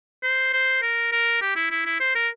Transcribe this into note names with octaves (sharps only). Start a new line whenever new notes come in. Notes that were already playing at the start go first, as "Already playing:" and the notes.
C5
C5
A#4
A#4
G4
E4
E4
E4
C5
A#4